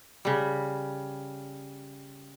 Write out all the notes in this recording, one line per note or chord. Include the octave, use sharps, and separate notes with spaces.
C#3 G3